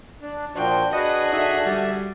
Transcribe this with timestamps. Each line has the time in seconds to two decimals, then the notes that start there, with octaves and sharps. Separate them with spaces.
0.22 D4
0.56 A#2 F3 D4 F#4 G5
0.93 F#4 G#4 B4 D#5
1.33 D3 D#4 E5
1.66 G3